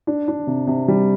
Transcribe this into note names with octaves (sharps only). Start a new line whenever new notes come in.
D4
D4
C3
C3
G3